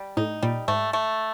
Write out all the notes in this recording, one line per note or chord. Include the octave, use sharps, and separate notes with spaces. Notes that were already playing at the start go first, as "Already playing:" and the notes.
Already playing: G3
A2 D#4
A#2 G3
G#2 A3
A3